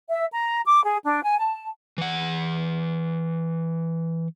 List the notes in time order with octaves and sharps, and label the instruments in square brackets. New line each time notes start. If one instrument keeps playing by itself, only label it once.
[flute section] E5
A#5
D6
G#4
D4
G#5
A5
[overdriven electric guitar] E3 F#5